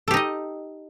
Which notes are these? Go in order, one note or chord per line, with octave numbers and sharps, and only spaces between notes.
D#4 G4 A4 D#5